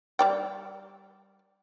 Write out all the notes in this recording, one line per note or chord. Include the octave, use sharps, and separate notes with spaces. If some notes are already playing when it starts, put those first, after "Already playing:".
G3 D5 G5